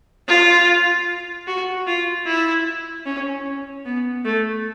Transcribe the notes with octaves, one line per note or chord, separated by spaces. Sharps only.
F4
F#4
F4
E4
C#4
B3
A3